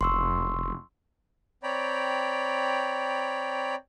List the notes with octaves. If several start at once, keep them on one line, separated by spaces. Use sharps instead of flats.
F1 C6 C#6 E6
C4 C#5 D5 G5 A#5 B5